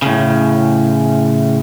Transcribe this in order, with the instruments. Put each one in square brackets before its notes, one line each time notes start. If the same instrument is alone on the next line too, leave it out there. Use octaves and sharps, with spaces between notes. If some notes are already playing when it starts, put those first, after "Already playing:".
[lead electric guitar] A2 C#3